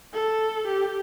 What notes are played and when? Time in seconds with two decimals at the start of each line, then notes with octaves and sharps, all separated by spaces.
0.13 A4
0.68 G4